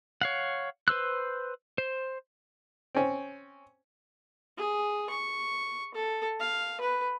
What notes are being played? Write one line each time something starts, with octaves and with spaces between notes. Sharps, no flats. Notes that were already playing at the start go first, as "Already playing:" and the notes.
C#5 F5 F#5
B4 C5 E6 F#6
C5
C4 C#4
G#4
C#6
A4
F5
B4